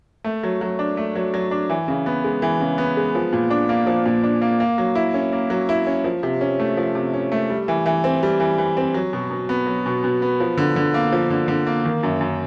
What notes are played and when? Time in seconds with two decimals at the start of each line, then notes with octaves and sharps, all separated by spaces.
0.24 A3
0.43 F#3
0.61 F#3
0.79 D4
0.97 A3
1.15 F#3
1.34 F#3
1.51 D4
1.70 E3
1.88 C#3
2.06 B3
2.24 G#3
2.42 E3
2.60 C#3
2.78 B3
2.97 G#3
3.15 F3
3.33 A#2
3.50 D4
3.69 A#3
3.87 F3
4.06 A#2
4.23 D4
4.42 A#3
4.60 A#3
4.78 F#3
4.95 E4
5.14 C#4
5.33 A#3
5.50 F#3
5.69 E4
5.87 C#4
6.04 F3
6.23 C3
6.41 C#4
6.59 A3
6.77 F3
6.95 C3
7.14 C#4
7.32 A3
7.50 G3
7.68 E3
7.86 E3
8.04 C4
8.23 G3
8.40 E3
8.58 E3
8.77 C4
8.94 F#3
9.13 B2
9.31 B2
9.49 B3
9.67 F#3
9.86 B2
10.04 B2
10.22 B3
10.40 F3
10.57 D3
10.76 D3
10.94 A#3
11.12 F3
11.30 D3
11.48 D3
11.67 A#3
11.85 D#3
12.03 F#2
12.21 F#2